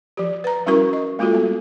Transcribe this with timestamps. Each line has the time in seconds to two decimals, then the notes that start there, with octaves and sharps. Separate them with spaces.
0.17 F3 G4
0.44 B4 A#5
0.66 G3 C#4 E4 F#4 A#4 C#6
0.93 D#5
1.19 G#3 A#3 F4 F#4 A4
1.33 G3 B3